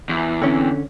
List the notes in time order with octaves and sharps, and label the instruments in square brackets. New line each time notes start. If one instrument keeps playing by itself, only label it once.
[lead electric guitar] E2
[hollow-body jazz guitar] D3 C#4 [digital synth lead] C4